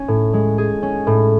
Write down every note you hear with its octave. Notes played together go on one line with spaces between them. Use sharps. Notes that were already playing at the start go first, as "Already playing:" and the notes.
Already playing: C#4
A2
G#3
G#4
C#4
A2